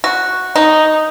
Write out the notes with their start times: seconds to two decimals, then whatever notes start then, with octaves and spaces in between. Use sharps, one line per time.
0.04 F#4
0.56 D#4